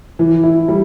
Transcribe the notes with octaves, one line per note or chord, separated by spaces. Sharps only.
E3
E4
G3